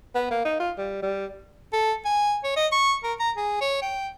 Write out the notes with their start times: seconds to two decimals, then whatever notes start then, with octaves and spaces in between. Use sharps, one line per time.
0.15 B3
0.31 A#3
0.45 D#4
0.60 F4
0.78 G3
1.03 G3
1.73 A4
2.06 G#5
2.44 C#5
2.57 D#5
2.72 C#6
3.04 A#4
3.20 A#5
3.37 G#4
3.61 C#5
3.82 G5